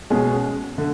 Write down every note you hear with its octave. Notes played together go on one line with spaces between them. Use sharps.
B2 G#3 C#4 G#4
D3